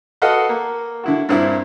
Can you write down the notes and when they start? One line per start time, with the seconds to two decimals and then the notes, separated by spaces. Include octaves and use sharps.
0.22 F#4 A4 B4 D#5 F5 F#5
0.49 A#3
1.04 D3 E4 F#4
1.29 G2 A#2 C4 E4